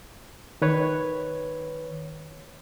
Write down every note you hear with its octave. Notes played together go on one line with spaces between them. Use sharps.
D#3 B4 C#5